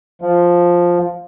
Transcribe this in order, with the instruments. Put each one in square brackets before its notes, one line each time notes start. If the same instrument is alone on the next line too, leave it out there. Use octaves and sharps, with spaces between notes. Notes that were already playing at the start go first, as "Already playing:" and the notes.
[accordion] F3